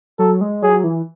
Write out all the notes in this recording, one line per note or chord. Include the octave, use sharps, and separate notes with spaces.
F#3 A4
G#3
F#3 G#4
E3